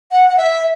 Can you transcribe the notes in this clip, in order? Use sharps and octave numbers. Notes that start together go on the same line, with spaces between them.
F#5
F#5
E5